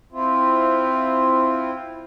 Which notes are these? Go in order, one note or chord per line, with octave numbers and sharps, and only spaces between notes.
C4 E4 F4